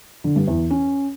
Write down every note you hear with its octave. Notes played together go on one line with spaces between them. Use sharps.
D3
G2
E2
C#4